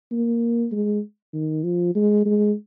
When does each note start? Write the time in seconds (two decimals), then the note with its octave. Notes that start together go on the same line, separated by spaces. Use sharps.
0.12 A#3
0.72 G#3
1.34 D#3
1.64 F3
1.95 G#3
2.26 G#3